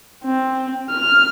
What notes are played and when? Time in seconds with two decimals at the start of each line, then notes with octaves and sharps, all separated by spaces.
0.24 C4
0.90 F6